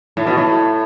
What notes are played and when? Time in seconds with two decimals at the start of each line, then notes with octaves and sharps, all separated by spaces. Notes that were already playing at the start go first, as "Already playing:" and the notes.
0.17 A2
0.26 B2
0.37 A2